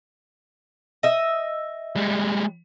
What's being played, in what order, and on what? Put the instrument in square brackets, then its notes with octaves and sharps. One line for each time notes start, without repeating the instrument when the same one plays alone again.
[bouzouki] D#5 E5
[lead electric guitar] G3 G#3